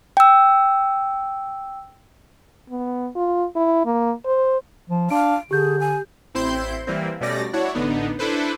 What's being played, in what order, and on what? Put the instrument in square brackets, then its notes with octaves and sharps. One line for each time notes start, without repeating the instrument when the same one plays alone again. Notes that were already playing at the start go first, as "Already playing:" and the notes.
[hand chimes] G5 E6
[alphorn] B3
F4
E4
A#3
C5
[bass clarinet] F3
[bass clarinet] D4 [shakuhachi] F5 [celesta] D7
[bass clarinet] D3 [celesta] G4 G6 [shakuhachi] G#4
[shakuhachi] G#5
[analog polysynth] A1 C4 E4 C5 C6 G6
E3 G3 A#3 C4
B2 G3 A3 C#4 D5 A#6
D4 E4 F#4 C#5
A1 D3 B3 D4 D#4
D4 E4 A4 B4 C5